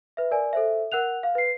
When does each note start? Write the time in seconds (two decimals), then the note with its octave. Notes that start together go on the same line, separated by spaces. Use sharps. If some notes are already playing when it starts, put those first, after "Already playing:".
0.17 B4 E5
0.31 A#4 D5 G#5
0.53 A4 C5 E5
0.92 A#4 F#5 F#6 F7
1.23 F5
1.35 B4 C7